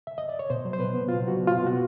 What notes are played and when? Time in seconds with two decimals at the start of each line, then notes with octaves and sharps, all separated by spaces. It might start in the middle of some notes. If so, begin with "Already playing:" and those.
0.07 E5
0.18 D#5
0.29 D5
0.39 C#5
0.50 B2 C5
0.65 F#3
0.73 C5
0.79 B2 B4
0.94 B3
1.08 B2 F4
1.23 F#3
1.28 F#4
1.37 B2
1.47 F4
1.52 B3
1.66 B3 F#4